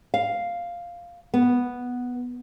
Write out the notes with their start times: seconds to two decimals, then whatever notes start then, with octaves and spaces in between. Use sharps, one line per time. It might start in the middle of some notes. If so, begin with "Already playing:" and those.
0.14 F5
1.34 B3